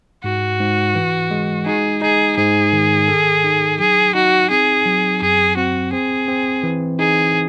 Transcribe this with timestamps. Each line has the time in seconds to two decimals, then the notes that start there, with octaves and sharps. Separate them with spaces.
0.24 G#2 F#4
0.60 G#2
0.95 E3
1.31 G#3
1.66 D#4 G#4
2.02 D#4 G#4
2.37 G#2 G#4
2.73 D#3
3.08 A4
3.44 D#4
3.79 F#3 G#4
4.14 D#4 F#4
4.50 C4 G#4
4.86 F#3
5.22 F#2 G#4
5.56 C4 F#4
5.92 C4 G#4
6.28 C4
6.63 E3
6.99 D#4 G#4